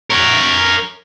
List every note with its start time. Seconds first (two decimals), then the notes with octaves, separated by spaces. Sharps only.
0.10 A#4 C#5